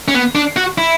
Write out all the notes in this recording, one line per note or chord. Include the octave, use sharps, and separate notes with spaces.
C#4
B3
D4
F#4
E4